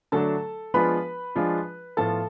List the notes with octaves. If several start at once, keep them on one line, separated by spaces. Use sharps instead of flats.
D3 F#3 A3 D4 A4 A5
F3 G#3 B3 D4 F4 B4 B5
F3 G#3 D4 F4
A2 F3 B3 F4 A4 A5